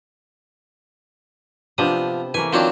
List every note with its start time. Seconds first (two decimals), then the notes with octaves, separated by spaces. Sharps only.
1.78 C3 F3 B3 D4 D#6
2.34 E3 A3 A#3 G#5
2.53 D#3 F3 C4 D4 F#4 C#5